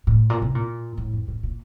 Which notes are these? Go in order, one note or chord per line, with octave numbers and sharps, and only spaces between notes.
A2
A#2
C3
A#2
A2
F2
A2
A#2